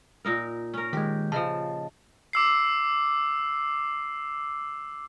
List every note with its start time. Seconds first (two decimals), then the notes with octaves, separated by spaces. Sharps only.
0.25 A#2 D#4 A#4
0.74 C#4 A#4
0.93 D#3 G#3 G4
1.32 C#3 F3 D#5 A5
2.33 D6 E6 C7